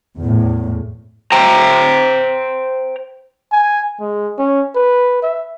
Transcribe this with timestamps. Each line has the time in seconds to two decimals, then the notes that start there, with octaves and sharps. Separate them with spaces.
0.18 E2 A2
1.32 C5 G5 A#5
3.52 G#5
4.00 G#3
4.38 C#4
4.75 B4
5.23 E5